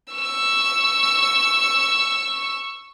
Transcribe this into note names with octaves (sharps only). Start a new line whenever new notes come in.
C#6 E6